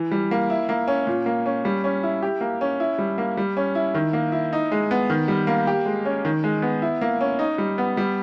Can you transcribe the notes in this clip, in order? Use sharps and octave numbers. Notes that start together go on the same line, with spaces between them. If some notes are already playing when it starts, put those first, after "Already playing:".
Already playing: E3
G3
A#3
E4
A#3
C#4
A#2
A#3
C#4
G3
C#4
E4
G4
A#3
C#4
E4
G3
A#3
G3
C#4
E4
D#3
A#3
E4
D#4
G#3
B3
D#3
G3
A#3
G4
G#3
C#4
D#3
G#3
B3
E4
A#3
C#4
D#4
G3
B3
G3